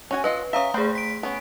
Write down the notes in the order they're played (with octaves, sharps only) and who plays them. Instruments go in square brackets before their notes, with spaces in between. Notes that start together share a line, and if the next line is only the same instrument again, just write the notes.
[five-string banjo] C#4 F#4 G#5
[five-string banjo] F4 D#5 F#5 [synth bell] B4
[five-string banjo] C#4 E5 [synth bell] F5 A#5 D#6
[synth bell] A3 G#4 [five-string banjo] B4 C5 G5
[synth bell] B6 D7
[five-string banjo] B3 C#4